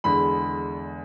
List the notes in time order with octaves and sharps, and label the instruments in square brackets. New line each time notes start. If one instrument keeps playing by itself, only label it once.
[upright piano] E2 D3 G#3 B5